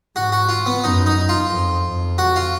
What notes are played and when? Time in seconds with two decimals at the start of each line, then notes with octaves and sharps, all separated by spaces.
0.16 G#2 F#4
0.32 F#4
0.49 F4
0.66 B3
0.84 F#2 D#4
1.06 D#4
1.29 F4
1.52 F2
1.85 F2
2.18 F#4
2.36 F4